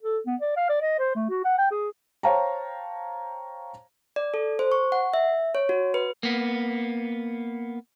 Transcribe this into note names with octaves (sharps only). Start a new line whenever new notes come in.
A4
B3
D5
F5
D5
D#5
C5
A3
F#4
F#5
G5
G#4
C5 C#5 F5 G5 A5 A#5
D5
A4
C5
C#6
F#5
E5
C#5
F#4
B4
A#3 B3